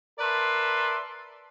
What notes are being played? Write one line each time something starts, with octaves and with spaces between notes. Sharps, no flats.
A#4 B4 D5 E5 A5 C6